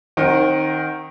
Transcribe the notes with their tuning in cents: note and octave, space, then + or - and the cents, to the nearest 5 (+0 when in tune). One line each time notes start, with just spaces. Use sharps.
D#3 +0 C4 +35 F#5 -10